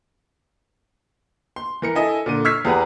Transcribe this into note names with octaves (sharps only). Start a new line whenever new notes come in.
C6
E3 A#4 C#7
E4 A4 D#5 E5 G#5
A#2 D3 D#7
C#6 E6 F6 G#6 B6 C7
E2 G4 G#4 B4 F#5 A#5